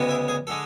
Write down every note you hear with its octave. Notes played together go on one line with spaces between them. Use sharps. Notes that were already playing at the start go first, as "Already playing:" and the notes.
Already playing: D2 C#3 G#3 B3
E4
G#4
D3 G#3 A4